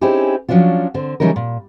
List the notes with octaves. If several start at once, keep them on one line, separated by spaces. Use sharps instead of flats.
C4 C#4 D#4 E4 G4 G#4
F3 F#3 C#4 D4 F4
D3 C4
C#3 E3 G3 C#4 D#4 A#4
A#2